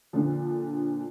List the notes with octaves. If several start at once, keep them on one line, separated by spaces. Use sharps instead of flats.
A#2 D3 F3